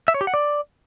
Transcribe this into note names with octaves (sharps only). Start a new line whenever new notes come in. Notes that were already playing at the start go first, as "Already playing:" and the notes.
E5
C#5
G4
F#5
D5